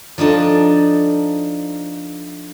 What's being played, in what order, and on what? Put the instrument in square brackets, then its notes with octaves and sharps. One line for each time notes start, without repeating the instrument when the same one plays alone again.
[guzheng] F3 D4 D#4 A4